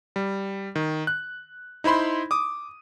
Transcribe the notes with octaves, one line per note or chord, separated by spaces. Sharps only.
G3
D#3
F#6
D#4 E4 C5 B5 C6
D6 D#6